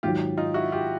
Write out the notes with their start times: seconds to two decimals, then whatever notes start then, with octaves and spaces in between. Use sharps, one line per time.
0.03 G#2 D#3 F#3 F4 G4
0.37 D#4 F4
0.54 E4 F#4
0.72 F4 G4